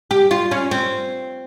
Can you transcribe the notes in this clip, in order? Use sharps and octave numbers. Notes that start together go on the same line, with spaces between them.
G4
F4
C#4
C4